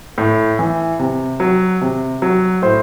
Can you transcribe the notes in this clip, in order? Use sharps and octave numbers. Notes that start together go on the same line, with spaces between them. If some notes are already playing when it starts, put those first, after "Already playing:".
A2
E3
C3
F#3
C3
F#3
A2 C5